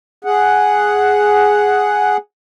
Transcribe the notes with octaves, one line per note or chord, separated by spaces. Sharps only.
G#4 F#5